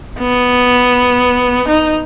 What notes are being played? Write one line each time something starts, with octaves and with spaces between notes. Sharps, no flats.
B3
D#4